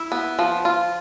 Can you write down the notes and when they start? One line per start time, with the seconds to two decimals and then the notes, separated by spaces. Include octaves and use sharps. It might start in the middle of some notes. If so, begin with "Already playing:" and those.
Already playing: E4
0.12 B3
0.39 F3
0.65 F4